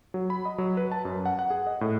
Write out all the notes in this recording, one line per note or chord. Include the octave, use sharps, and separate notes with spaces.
F#3
B5
D#5
F#3
B4
A5
F#2
F#5
F#5
G#4
D#5
A2